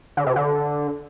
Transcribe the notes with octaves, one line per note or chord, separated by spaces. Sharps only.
D3
C3
D3